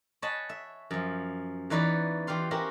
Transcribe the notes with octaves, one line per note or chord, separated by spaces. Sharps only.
C#5 D#5 F#5 G#5 A5 B5
E5
F#2 F3
E2 E3 D#4 B4 C#5 D5
E3 F4 G4 F5 C6
C#4 F#4 G4 A#4 C5 E5